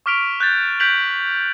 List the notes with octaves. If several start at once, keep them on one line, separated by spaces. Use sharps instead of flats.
C#6 D6 F6 B6 D7 F7
F#6 G6 A6
F#6 G6 B6 D7 F7 F#7